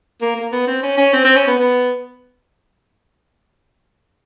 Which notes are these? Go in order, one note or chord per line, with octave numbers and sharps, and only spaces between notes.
A#3
A#3
B3
C4
C#4
C#4
C4
C4
C#4
B3
B3